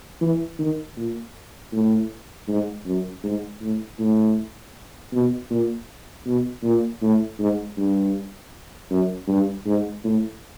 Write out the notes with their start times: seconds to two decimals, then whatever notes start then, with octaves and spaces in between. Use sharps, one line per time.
0.21 E3
0.59 D#3
0.97 A#2
1.72 A2
2.48 G#2
2.86 F#2
3.24 G#2
3.61 A2
3.99 A2
5.12 B2
5.50 A#2
6.26 B2
6.63 A#2
7.02 A2
7.39 G#2
7.77 G2
8.90 F#2
9.28 G2
9.66 G#2
10.04 A2